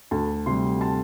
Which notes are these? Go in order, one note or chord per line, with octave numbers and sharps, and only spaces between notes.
D2 A5
C3 G3 C6
A5